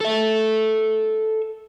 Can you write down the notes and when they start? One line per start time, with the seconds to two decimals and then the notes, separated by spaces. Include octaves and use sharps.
0.01 A4 E5